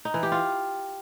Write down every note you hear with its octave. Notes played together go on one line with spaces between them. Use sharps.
D#4
E3
G4
F4